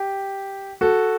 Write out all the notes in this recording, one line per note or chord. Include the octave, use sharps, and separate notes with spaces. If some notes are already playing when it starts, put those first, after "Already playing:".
Already playing: G4
F#4 A4